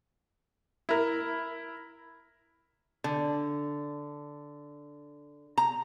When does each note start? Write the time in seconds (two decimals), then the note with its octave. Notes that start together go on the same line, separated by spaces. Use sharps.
0.89 E4 A#4
3.04 D3
5.58 A#5